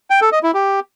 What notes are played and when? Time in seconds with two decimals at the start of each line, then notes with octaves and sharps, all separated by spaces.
0.10 G5
0.21 A4
0.32 D#5
0.43 E4
0.54 G4